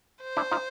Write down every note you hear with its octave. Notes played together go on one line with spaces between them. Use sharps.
C5
D4 E4
D#4 F4